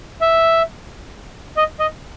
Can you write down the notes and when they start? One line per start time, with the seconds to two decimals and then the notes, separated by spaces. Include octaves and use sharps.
0.21 E5
1.57 D#5
1.80 D#5